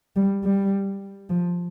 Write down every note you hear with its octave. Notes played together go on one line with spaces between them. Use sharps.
G3
G3
F3